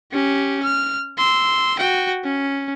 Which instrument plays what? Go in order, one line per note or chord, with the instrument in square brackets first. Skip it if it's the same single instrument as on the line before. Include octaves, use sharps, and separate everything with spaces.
[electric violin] C#4 G4
F6
C6 E6
F#4 G5
C#4